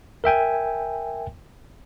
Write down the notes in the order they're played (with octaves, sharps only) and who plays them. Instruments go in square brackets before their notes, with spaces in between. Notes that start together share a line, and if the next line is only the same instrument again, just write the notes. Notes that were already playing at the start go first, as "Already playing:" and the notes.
[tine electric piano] A#4 E5 G5 G#5